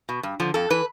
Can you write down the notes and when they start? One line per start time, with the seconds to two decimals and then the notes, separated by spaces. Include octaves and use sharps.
0.09 B2
0.23 G2
0.40 D3 F3
0.54 F2 A4
0.70 E3 B4